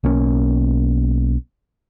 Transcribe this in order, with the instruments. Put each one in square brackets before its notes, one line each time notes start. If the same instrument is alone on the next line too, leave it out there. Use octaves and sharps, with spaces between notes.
[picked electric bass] B1 A#3 C#4